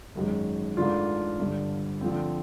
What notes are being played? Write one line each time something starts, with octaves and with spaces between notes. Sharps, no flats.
G#1 F#2 D#3 G#3
G#2 E3 A3 D4 F4
G1 G2 D3
D3 F3 A3 C4